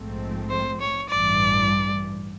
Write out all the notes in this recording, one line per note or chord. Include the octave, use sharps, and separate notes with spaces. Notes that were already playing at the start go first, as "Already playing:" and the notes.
Already playing: A#1 G#2 F3 A3 C4
C5
C#5
A1 G2 E3 D5